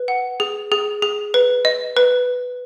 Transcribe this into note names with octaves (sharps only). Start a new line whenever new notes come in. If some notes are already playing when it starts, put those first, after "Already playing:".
Already playing: B4
F#5
G#4
G#4
G#4
B4
D#5
B4